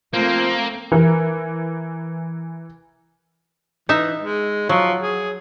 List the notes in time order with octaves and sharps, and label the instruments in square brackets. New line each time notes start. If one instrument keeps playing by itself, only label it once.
[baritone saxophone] F3 [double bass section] A3 C4 [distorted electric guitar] A#3
[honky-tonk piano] E3 A#4
[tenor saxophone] E3 [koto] D#4 E5
[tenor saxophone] G#3
[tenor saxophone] F3 [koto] F#3
[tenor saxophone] G#4